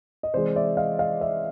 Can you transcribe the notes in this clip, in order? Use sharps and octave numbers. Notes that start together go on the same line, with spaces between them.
D#5
C3 E3 G#3 C5 D5
D5 E5
D#5 F5
D#5 F5
D5 E5